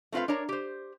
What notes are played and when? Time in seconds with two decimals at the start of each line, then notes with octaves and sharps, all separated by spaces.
0.12 A3 C4 F4 B4 F5
0.28 D4 A#4 C#5 A#5
0.49 G4 C5